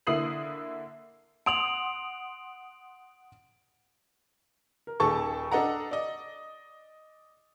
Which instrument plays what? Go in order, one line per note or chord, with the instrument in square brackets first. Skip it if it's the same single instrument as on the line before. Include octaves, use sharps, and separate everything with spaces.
[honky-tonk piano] D3 A#3 E4 D#6 C7 F#7
[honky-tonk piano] F#5 C6 D#6 [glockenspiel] D7 F7 F#7
[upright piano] A#4
D#1 D#2 G#4 A4 A5 C#6
D4 A4 D#5 F#5 A#5
D5 D#5